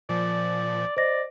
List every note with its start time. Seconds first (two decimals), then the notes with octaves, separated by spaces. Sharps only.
0.09 A#2 F3 D5
0.97 C5 D5 D#5 A#6